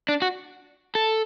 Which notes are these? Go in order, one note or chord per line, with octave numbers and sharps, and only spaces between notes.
D4
F#4
A4